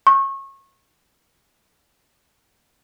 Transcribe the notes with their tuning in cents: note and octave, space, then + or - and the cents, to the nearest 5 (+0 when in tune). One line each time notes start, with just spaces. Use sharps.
C#6 -25